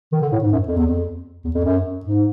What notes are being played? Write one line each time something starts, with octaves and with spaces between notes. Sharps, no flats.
D#3
D3
A2
G#2
F#2
F2
E2
F2
E2
F2
F#2
G#2